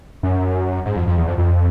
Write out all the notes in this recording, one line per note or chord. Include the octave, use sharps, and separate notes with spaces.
F#2
G#2
F2
F2
E2
F2
F2